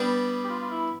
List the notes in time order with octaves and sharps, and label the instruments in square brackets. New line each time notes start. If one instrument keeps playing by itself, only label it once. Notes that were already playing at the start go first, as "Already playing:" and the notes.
Already playing: [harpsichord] G3 B3 D4 [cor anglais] G4
[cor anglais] G4
F4
F4
E4